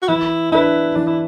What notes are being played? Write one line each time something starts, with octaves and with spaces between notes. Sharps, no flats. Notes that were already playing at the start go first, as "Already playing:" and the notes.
F#4
E3 E4
D4 E4 B4
E3 D4
E4